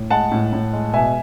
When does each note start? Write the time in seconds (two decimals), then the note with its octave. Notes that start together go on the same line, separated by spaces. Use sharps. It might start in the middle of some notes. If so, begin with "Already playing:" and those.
Already playing: A2
0.10 G#3 F#5 A5
0.32 A2
0.53 A2
0.73 G#3
0.93 B2 E5 G#5